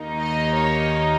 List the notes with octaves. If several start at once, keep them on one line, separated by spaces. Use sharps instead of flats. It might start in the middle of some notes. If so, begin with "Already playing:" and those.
Already playing: D#2 D#3 A#3 D#4
D#5
C#5